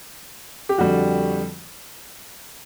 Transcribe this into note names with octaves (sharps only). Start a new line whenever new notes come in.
G4
F2 D3 G3 F#4